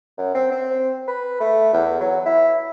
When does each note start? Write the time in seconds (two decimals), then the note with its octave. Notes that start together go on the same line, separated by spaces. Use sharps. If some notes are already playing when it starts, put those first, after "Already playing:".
0.18 F#2
0.35 C4
0.51 C4
1.07 B4
1.40 A3
1.73 E2
2.00 F#3
2.25 E4